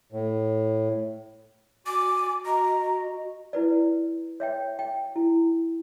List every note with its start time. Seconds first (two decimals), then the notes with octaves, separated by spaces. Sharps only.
0.12 A2
1.86 F#4 G#5 D6
2.45 F#4 D#5 A#5
3.53 E4 B4 D5
4.40 C#5 E5 G5
4.79 G5
5.16 E4